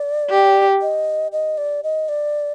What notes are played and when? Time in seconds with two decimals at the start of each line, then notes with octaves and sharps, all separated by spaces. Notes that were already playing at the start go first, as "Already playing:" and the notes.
Already playing: D5
0.30 G4
0.82 D#5
1.32 D#5
1.58 D5
1.83 D#5
2.09 D5